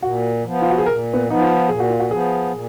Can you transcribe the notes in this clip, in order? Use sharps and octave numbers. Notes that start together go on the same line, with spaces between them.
A#2 F#4
F3 B3
F4
F#4
G#4
A#2 A#4
B3
F3 B3 D#4
F4
A#2 G#4
F#4
F4
F#4
F3 B3 G#4
A#2